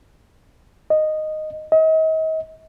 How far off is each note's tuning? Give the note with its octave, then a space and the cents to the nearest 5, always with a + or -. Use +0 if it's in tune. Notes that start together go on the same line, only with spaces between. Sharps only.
D#5 -5
D#5 +40